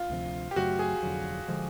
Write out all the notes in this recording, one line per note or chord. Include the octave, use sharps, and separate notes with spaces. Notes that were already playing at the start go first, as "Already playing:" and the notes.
Already playing: F4
D2 C3 F3
G4
F#2 C#3 F#3 A3 F#4
G#4
F1 F2 D3 F#3
D3 F3 G#3